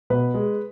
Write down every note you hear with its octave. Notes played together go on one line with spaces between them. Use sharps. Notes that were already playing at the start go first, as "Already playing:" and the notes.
B2 B4
G#3